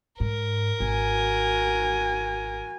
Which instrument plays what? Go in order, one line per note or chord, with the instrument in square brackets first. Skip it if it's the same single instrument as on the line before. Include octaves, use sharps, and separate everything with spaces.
[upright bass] G#2 [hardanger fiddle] A#4
[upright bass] G#1 [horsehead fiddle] F#4 G#5